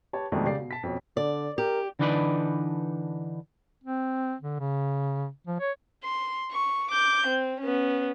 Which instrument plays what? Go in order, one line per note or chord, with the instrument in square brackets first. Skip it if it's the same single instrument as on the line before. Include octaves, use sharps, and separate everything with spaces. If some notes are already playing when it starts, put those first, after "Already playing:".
[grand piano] G4 B4 C#5 A5
F2 B2 D#3 G#3 A3 D4
C#3 G4 D5 C7
B2
A5 B6
F2 B2 C#4
[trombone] D3 [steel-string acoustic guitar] D5
[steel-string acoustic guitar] G4 [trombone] A#4
[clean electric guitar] D3 E3 D4 D#4 B4 D5
[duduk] C4
D3
C#3
F3
C#5
[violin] C6
C#6
D6 G6
C4
B3 C#4